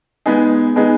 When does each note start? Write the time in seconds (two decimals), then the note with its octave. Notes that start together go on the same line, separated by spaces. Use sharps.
0.26 G#3 B3 D#4 G#4
0.76 G#3 B3 D#4 G#4